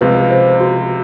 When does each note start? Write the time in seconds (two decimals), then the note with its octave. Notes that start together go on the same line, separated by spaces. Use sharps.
0.01 C#2 C3 F3 B4
0.31 C5
0.60 F#4